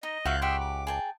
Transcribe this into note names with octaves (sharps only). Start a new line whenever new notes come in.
D#4 D#5
C#2 F#4 E5 F5 C#6 F#6 G6
G4 E5 F#5 G5 C6 C#6
D6
G#4 G5 A5